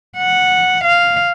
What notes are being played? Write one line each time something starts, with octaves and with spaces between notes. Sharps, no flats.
F#5
F5